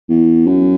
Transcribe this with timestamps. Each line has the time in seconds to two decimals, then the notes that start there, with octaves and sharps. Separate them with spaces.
0.10 E2
0.47 F#2